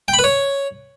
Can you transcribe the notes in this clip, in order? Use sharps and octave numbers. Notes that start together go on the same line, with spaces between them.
G5
B5
B4
C#5